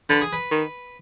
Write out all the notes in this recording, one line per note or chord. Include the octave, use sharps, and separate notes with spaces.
D3 B4
G#4
B4
D#3